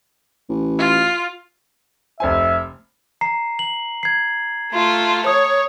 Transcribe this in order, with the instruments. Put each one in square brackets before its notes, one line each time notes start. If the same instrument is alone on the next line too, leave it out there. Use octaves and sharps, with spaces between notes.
[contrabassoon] A1
[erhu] F4
[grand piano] F1 C5 G#5 [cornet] E5
[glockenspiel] A#5 C7
F#7
G#6 C7
[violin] A3 F4
[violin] C#5 [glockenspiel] D#6